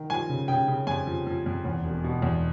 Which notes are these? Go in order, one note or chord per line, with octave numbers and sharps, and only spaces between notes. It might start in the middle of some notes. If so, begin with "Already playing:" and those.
Already playing: D#3
F3 G#5
C#3
C#3 G5
C#3
F2 G#5
F3
F3
F2
E2
E1
B2
E2